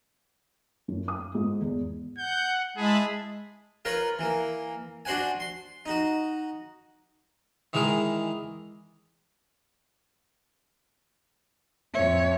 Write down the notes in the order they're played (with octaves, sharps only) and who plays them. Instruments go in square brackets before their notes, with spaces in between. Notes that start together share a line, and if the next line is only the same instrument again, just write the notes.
[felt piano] F#2
D#6
G#2
E2
[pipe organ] F#5 [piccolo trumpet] G6
[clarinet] G#3 [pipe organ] E4 A5 B5 [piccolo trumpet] G#4
[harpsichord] F4 A#4 B4 C#5
E3 A#3
D4 F#4 C5 F#5 G#5
C6
D#4 F#4
D#3 E3 G#3 G#4 A#4
[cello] F2 C#5 [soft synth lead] E5